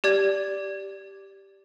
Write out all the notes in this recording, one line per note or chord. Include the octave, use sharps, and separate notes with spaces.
G4 D5 G#6